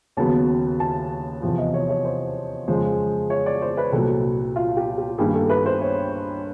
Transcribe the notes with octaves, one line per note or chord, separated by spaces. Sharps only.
D#2 C#3 F#3 B3 A5
A5
E2 C3 F3
D#5
C#5
C#5
C5
F2 C#3 F3 G#3 C5
C#5
D5
C5
B4
C2 A#2 F#3 A4
F4
G4
G4
G2 D#3 G3 A#3 G#4
A4
B4
C5
C#5